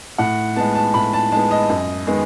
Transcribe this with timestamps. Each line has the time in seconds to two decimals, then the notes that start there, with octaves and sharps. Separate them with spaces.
0.18 A2 F#5
0.56 G#3 B3 A5
0.75 A5
0.94 A2 B5
1.13 A5
1.32 G#3 B3 A5
1.51 D#5
1.69 F#2
2.07 D#3 G#3 B3